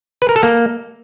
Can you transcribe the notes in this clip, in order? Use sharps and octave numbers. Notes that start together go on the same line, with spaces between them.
B4
A#4
A4
A#3